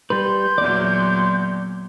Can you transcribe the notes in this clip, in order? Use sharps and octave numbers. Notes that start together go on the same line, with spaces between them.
G3 B4 C6 G6
E2 A#2 F#3 D5